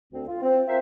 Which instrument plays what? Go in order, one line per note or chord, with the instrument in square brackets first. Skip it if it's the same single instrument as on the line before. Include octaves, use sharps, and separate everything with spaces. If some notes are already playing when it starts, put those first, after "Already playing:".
[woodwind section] D2 C4
F4
C4
F4 A#4 C5 E5